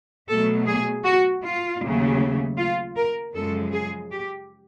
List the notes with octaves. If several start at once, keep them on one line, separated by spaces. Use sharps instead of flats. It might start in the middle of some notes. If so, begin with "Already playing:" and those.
B2 F#3 A3 A4
G#4
F#4
F4
D#2 C#3 F#3 A3
F4
A#4
F#2 C#3 F3 G#3 A4
G#4
G4